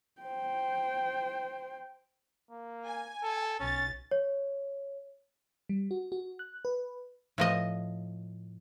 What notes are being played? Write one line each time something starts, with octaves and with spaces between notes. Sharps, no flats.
C5 G5
A#3
G#5
A4
B1 C#4 A6
C#5
G3
F#4
F#4
F#6
B4
A2 F3 D#5